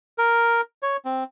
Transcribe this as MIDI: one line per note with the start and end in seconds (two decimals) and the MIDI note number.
0.18 0.61 70
0.83 0.97 73
1.05 1.24 60